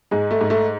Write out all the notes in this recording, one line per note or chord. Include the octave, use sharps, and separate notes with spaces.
G#2 G#3
A3
G#2
A3